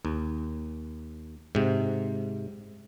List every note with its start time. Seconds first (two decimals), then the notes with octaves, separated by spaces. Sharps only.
0.05 D#2
1.55 G#2 C3